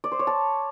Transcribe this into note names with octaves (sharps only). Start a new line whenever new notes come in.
D5
C5
C#5
A5